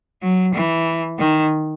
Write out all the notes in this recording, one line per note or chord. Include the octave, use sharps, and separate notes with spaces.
F#3
E3
D#3